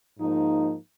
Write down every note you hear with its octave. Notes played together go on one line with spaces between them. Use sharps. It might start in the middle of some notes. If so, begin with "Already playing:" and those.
G#2 F3 A#3 D#4